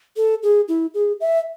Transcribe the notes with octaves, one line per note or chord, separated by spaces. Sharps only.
A4
G#4
E4
G#4
E5